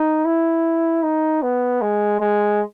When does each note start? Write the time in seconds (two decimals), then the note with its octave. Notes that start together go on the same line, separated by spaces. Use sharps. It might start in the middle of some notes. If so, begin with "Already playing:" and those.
Already playing: D#4
0.25 E4
1.03 D#4
1.43 B3
1.82 G#3
2.21 G#3